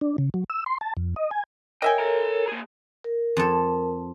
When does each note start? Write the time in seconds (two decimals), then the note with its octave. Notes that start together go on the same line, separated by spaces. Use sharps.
0.01 D4
0.18 C#3
0.34 F#3
0.50 E6
0.66 C6
0.81 A5
0.97 F2
1.16 D#5
1.31 G#5
1.82 A#4 C#5 D#5 E5 G5 G#5
1.98 A4 A#5
2.48 A#3 G#4
3.04 A#4
3.37 F2 A4